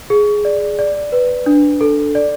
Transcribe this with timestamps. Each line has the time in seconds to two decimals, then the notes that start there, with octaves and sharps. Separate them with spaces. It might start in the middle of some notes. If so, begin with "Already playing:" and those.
0.10 G#4
0.45 D5
0.79 D5
1.12 B4
1.46 D4
1.81 A4
2.15 D5